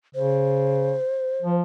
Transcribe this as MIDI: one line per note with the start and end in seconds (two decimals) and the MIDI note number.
0.15 0.97 49
0.15 1.55 72
1.42 1.63 53